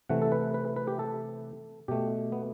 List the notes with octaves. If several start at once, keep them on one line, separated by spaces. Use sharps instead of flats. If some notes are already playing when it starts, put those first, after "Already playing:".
C3 E3 A3 F#5
A4
B4
B4
B4
G4
A4
B2 A3 G4
B3